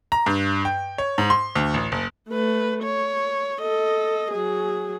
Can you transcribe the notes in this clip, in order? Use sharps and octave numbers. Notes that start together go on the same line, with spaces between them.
A#5
G2
G5
C#5
G#2
C6
D2
A1
F#1
A3 B4
C#5
A4 D#5
F#3 G#4